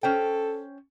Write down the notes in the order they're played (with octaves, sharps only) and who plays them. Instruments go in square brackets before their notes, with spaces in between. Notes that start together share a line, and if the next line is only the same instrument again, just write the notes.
[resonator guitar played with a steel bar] C#4 C5 G5 [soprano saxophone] A4